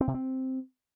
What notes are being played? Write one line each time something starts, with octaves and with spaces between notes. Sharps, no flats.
C4
C3
C4